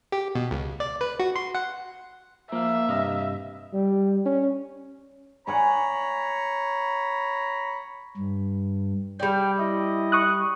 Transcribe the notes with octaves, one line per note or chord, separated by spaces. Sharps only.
G4
B2
C#2
D5
B4
F#4
C6
F#5
F3 A#3 E5 F5
G2 C3 D#5 F5
G3
C#4
C#5 F#5 G#5 A#5 B5 D6
G2
G3 D5 G5
E4 D#5
C#6 D#6 F#6